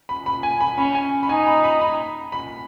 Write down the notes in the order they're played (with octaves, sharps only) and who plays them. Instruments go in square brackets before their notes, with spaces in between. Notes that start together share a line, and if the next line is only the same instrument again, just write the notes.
[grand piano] B5
B5
G#5
B5
[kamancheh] C#4 [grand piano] B5
[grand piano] G#5
B5
[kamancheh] D#4 [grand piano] G#5
[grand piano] B5
B5
B5
B5